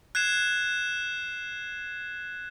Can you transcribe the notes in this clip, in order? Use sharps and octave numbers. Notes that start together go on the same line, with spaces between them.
F#6 G#6 C7 E7